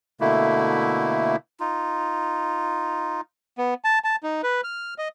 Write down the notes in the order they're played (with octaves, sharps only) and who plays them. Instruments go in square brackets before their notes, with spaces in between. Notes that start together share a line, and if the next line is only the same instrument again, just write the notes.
[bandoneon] B2 D3 A3 A#3 E4
[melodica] D#4 F4
[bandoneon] B3
A5
A5
D#4
B4
F6
D#5